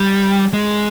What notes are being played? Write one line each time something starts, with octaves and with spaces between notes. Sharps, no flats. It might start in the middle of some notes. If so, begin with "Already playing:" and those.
Already playing: G3
G#3